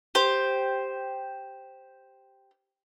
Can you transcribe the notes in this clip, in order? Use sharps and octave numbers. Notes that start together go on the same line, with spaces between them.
G4 C5